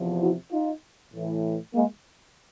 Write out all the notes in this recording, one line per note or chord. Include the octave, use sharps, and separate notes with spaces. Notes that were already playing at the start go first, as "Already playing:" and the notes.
Already playing: E2 C3 F3
E4 F#4
D#4 F4
A2 E3
G#3 A#3